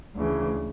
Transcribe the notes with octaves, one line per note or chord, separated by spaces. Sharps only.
D2 C#3 E3